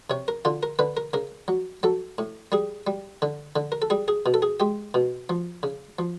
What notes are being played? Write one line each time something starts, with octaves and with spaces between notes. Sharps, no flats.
C3 C#5
A#4
D3 F4
A#4
D3 B4
A#4
C#3 A#4
F#3
F#3 A4
A2
G3 G#4
G3
D3
D3
A#4
A4
G3 G#4
G#4
B2
A4
G#4
G#3 G4
B2
F3
C#3
F3